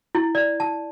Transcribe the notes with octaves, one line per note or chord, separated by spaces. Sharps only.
E4
D5
A5